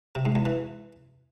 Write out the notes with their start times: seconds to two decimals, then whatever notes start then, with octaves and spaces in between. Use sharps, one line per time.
0.15 C3
0.25 G#2
0.35 E2
0.45 E3